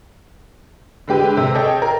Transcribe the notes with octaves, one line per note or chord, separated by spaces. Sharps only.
D3 G#3 G4 B4
C3
G#4 A4 C#5 D#5 G5
A#4